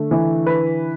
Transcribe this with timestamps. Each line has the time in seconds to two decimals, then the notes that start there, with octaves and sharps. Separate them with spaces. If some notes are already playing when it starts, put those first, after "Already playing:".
Already playing: D3 A3
0.11 E3
0.46 B4